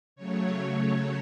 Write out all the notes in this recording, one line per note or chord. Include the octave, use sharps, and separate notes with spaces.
C#3 F#3 A3 C#5
C#5